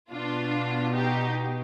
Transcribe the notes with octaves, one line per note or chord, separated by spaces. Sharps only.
B2 D4 F4
D#4 G4